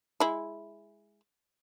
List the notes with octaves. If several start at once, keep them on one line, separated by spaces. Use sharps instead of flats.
G#3 E4